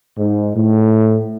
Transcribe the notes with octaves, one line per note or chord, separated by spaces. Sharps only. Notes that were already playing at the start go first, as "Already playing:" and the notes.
G#2
A2